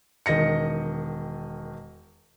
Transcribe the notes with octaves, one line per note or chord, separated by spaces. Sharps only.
E1 D#3 D#5 A#6 C#7